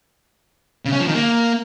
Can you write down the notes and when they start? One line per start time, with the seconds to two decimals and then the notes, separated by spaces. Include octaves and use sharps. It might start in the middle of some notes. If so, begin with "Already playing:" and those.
0.85 C#3
0.93 C#4
1.00 F3
1.07 D#3
1.14 A#3